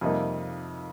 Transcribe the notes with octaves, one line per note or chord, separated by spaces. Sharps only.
F2 C3 G3 A#3 D#4